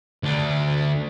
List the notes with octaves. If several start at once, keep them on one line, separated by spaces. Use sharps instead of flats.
D2 D4